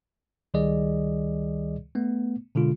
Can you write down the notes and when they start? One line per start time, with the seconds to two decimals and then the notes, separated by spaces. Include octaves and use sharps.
0.54 C#2 D#3 G3 G#4 D5 D#5
1.95 A3 B3
2.55 B2 D3 G#3 F4